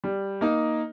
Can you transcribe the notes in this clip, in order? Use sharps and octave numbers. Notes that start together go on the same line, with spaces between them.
G3
A#3 D#4